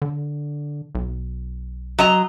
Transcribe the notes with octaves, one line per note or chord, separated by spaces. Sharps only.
D3
B1
F#3 D#5 A#5